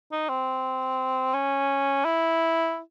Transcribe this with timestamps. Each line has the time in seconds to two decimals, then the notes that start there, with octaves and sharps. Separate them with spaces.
0.12 D#4
0.29 C4
1.34 C#4
2.05 E4